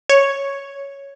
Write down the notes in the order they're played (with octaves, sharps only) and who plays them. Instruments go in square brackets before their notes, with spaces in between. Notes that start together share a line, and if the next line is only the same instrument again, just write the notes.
[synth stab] C#5